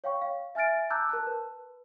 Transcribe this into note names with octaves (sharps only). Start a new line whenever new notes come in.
C#5 F5 G5 C#6
F5
E5 G#5 F6 A6 D7
A5 A#5 D6 E6 F#6 G6
A#4 A5 F#6
B4